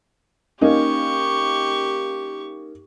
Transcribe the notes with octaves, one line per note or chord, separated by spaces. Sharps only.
A#3 C#4 D#4 G4 C#6